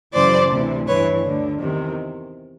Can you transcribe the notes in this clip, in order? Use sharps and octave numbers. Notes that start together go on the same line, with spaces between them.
F#2 C#3 E3 C5 D5
D2 C3 E3
G2 E3 B4 C#5
D2 D3
E2 C3 D#3